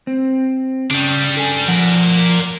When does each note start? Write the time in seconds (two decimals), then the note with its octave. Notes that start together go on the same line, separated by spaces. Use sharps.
0.07 C4
0.91 C#3 G3 D4
1.37 A4 G#5
1.68 F3 A#4 D5 F#5